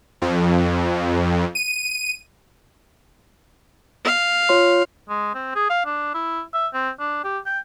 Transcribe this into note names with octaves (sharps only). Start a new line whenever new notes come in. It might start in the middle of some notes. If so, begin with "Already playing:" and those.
F2
D#7
F5
F4 C#5 C6
G#3
C4
G#4
F5
D4
E4
E5
C4
D4
G4
G5